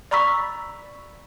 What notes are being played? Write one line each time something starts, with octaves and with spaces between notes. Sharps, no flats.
D5 A#5 B5 C#6 E6 B6